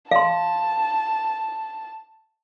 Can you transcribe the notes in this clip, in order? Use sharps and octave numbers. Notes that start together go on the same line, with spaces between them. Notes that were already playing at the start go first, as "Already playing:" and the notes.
F5 A5 C6